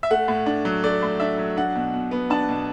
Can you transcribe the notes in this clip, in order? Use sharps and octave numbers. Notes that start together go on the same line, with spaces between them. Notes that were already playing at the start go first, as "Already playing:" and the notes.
E5
A3 F#5
A2
D4
F#3
A3 D5
A2
D4 E5
F#3
D4 F#5
B2
B2
B3
D4 A5
B2